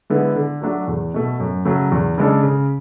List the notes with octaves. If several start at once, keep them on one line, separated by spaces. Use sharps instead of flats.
D3 G#3 B3 E4
D3
F#3 A3 D4 F#4
E2
B2 A3
F#2
C#3 F#3 A3
E2
C#3 G#3 D4 A4
C#3